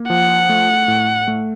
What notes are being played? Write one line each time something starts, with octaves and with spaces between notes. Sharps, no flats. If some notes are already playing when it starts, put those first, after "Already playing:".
Already playing: A#3
F3 F#5
A3
A2
A3